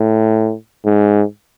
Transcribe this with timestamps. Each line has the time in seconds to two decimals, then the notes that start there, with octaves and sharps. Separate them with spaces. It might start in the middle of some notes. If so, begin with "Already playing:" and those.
Already playing: A2
0.85 G#2